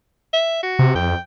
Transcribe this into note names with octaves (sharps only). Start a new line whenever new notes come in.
E5
F#4
C3
F2 G5